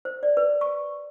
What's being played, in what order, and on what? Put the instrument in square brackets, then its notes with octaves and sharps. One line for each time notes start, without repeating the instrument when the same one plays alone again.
[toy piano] C5
D5
B4
C#6